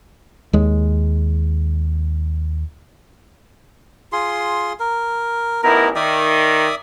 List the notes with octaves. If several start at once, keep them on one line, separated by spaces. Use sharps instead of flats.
D#2 G#3
F4 G#4 C6
A#4
A1 B3 D#4 E4 A#4
D#3 D5 E5 D#6